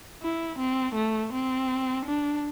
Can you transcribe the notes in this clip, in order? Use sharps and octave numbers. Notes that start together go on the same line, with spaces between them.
E4
C4
A3
C4
D4